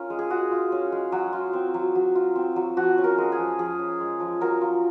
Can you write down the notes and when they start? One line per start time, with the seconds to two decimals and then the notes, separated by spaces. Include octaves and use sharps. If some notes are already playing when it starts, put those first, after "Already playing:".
Already playing: C#4 F4 A#4
0.10 G#3
0.19 G#4
0.30 G#3 F#4
0.51 F4
0.72 C#4
0.92 G#3
1.12 F#3 F#4
1.33 F4
1.53 C4
1.74 F#3
1.95 F#3
2.15 F4
2.35 C4
2.56 F#3
2.77 F3 F#4
2.98 C#4
3.04 A#4
3.18 G#3
3.32 G#4
3.39 F3
3.59 F3 G#4
3.79 C#4
4.00 G#3
4.20 F3
4.41 F#3 A#4
4.61 F4